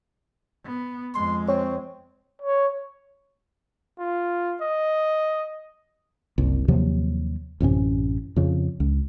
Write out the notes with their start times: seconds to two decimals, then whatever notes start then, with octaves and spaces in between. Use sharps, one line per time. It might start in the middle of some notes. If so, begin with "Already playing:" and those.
0.65 B3
1.15 F2 G#3 C6
1.48 C4 C#5
2.42 C#5
3.99 F4
4.61 D#5
6.38 F#1 C2
6.68 D#2 C3 F3 F#3
7.60 A1 F#2 C3 C#4
8.36 F2 C#3
8.80 C#2